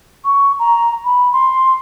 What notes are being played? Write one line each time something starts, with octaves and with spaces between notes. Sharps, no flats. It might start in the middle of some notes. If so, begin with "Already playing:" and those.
C#6
A#5
B5
C6